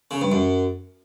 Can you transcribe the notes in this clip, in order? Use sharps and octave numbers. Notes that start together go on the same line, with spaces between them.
C#3
G2
F#2